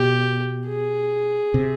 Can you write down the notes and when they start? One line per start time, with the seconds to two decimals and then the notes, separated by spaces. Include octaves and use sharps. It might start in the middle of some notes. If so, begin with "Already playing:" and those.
Already playing: B2 G4
0.67 G#4
1.54 C3